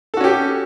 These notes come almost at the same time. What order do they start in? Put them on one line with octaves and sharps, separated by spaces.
A4 F#4 C#4 G4